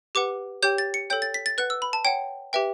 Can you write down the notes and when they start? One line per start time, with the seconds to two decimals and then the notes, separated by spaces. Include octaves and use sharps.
0.15 G4 B4 F#5 D6
0.63 G4 C#5 G5 G6
0.78 A6
0.94 C#7
1.10 A4 C#5 G5 G6
1.22 A6
1.34 B6
1.46 A6
1.58 B4 F#5 F#6
1.70 E6
1.82 B5
1.93 A5
2.05 C#5 F#5 G5
2.53 G4 B4 E5 G5